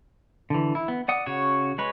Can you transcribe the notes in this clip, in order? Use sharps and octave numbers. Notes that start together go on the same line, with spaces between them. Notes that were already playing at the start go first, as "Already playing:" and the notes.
D3 E3
E4
B3
D5 F#5 D#6
C#3 F#4 C#5
G#3 B4 C#5